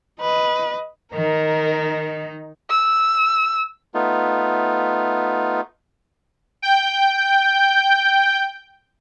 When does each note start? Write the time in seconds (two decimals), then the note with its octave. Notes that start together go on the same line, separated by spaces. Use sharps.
0.20 B4 D#5
1.13 D#3 D#4 A#4
2.70 E6
3.94 A3 B3 D#4 F4
6.62 G5 G6